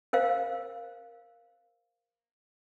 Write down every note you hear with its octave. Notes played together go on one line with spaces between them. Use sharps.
A#4 C5 F5